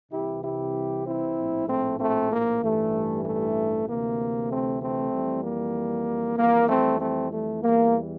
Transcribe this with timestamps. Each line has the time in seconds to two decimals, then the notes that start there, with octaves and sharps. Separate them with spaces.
0.11 C2 C3 E3 G3 E4 G4
0.42 E4 G4
1.05 C4 E4
1.36 A#1 A2 F3
1.67 A3 C4
1.99 A3 C4
2.30 A#3
2.62 A1 G2 E3 G3 A3
3.24 A3
3.86 D2 C3 E3 A#3
4.50 A3 C4
4.81 A3 C4
5.11 F2 E3 G3
5.43 A#3
6.37 F2 E3 G3 A#3
6.68 A3 C4
6.99 A3 C4
7.31 A3
7.62 E2 E3 G3 A#3